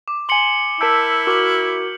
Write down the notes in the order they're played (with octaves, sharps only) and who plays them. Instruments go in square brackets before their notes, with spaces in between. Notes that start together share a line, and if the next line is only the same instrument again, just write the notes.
[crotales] D6
[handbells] G#5 C6 [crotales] C#7 F#7 G7
[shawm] E4 [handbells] A#4 A5 E6 [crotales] G6 B6 D7
[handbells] F#4 A#4 D6 [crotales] F6 F#7